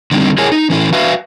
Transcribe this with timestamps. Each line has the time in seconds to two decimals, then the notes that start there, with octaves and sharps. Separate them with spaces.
0.11 D3 D#3 G3 C4
0.38 E4 G#4 A#4 C#5 G#5
0.52 D#4
0.70 E3 C#4 E4
0.93 F#4 B4 E5 F5